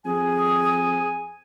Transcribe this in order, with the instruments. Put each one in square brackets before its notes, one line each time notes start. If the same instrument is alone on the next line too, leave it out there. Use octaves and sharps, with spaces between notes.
[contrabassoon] F2 [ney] G#4 [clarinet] G#5